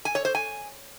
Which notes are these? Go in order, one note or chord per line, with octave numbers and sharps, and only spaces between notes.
G#5
C#5
C5
G#5